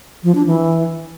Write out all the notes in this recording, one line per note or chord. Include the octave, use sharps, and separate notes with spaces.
F3
D4
E3